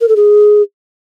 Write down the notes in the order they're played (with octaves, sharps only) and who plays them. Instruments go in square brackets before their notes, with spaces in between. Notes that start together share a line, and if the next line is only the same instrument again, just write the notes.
[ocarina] A#4
A4
G#4